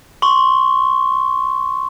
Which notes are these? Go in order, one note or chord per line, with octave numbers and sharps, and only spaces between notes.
C6 C#6